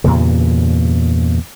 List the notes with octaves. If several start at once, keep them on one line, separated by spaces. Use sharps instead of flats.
E2 G2 A#2 C#3